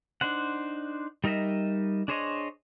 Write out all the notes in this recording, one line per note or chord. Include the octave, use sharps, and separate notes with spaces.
D4 D#4 C5 F#5
G3 D#4 A#4 D#5 E5
D4 G#4 C5 C#5 D#5